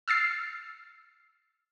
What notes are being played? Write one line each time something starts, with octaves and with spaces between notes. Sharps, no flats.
E6 F6 A6 C7